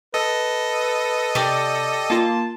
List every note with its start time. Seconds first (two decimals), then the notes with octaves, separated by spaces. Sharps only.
0.14 A4 B4 D#5
1.35 C3 G4 D5
2.10 A#3 F4 A5